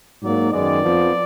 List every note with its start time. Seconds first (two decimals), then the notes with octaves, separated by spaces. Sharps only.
0.21 G#2 F#3 A#3 D5
0.52 F#2 D#3 G#3 B3 D5
0.82 F2 F3 B3